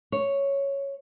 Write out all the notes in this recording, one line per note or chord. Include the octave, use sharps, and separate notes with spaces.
C#5